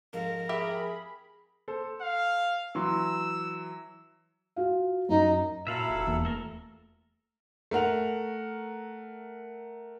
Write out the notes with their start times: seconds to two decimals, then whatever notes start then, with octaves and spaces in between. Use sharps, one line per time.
0.13 F2 G#2 F3 A#4
0.49 G4 G#4 E5 B5
1.68 A4 C5
2.01 F5
2.75 E3 F#3 C6 E6
4.56 F4 F#4 F5
5.09 F#2 D#4
5.67 A#2 F#3 E4 A4 E5 F5 B5
5.89 F1
6.07 D#1 E2 A#3
6.25 A3 A4 A#4
7.71 A3 A#4 F#5 F7